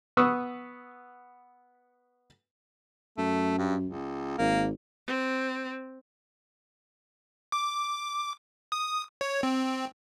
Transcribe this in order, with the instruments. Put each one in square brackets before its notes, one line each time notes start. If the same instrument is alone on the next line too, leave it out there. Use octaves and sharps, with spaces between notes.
[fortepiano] B3 B4 C#6 D#6 E6
[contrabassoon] F#2 [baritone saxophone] A3
[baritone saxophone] G2
C#2
[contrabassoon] G#1 [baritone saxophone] A#3
[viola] C4
[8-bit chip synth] D6
D#6
C#5
C4